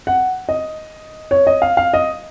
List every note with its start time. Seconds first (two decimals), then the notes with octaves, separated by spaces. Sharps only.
0.07 F#5
0.49 D#5
1.31 C#5
1.47 D#5
1.62 F5
1.77 F5
1.94 D#5